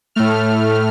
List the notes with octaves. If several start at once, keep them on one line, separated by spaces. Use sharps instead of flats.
A2 A3 F6